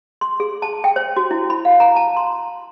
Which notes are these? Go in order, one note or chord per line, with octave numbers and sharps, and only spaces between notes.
C6
G#4
A5
G5
C5
F#4
E4
B5
F5
A#5
A5
C6